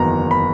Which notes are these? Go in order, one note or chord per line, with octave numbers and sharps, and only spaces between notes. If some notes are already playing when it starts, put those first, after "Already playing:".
Already playing: F#1 E2 D#3 F#3 B3 A#5
B5